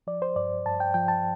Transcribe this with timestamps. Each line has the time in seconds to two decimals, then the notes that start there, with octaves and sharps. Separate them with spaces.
0.07 F3 D5
0.22 C5
0.36 G2 D5
0.66 G2 A5
0.80 G5
0.94 F3 G5
1.08 A5